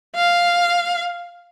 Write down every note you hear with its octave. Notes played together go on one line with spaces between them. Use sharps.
F5